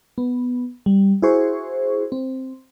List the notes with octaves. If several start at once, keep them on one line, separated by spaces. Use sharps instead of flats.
B3
G3
E4 F#4 G#4 C5 C#6
C4